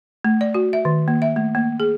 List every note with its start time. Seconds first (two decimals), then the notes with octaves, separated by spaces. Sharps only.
0.25 A3
0.41 D5
0.54 F#4
0.73 E5
0.85 D#3
1.08 A#3
1.22 E5
1.36 A3
1.55 A#3
1.80 G#4